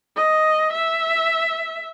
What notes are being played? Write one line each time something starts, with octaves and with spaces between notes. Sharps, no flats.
D#5
E5